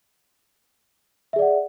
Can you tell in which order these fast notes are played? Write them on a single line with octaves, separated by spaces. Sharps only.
E5 G#4 D5 F#5